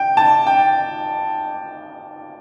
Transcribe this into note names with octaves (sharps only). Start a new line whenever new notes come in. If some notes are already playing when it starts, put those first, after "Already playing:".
Already playing: G5
A5
G5